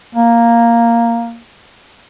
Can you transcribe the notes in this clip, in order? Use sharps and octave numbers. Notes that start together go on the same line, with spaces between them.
A#3